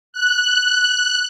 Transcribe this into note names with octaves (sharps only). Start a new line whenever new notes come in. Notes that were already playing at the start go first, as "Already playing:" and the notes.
F#6